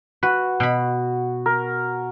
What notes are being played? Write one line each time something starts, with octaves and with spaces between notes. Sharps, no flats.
F#4 B4
B2 B5
A#4